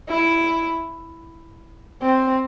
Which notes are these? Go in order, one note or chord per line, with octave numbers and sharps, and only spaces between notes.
E4
C4